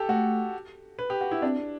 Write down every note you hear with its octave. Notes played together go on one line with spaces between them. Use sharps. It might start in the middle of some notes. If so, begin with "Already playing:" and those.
Already playing: G4 A4
A3 F#4
B4
G4
F#4
E4
C4 D4